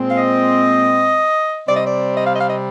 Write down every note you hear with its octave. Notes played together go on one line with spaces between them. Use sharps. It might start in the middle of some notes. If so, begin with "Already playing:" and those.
Already playing: A#2 G#3 C4
F5
D#5
C3 G3 C4 D5
D#5
D5
D#5
F5
D#5
F5
D#5